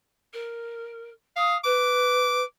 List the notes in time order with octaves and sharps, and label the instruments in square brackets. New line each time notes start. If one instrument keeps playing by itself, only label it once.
[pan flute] A#4
[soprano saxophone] F5 [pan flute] D#6
[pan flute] B4 [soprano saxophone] D6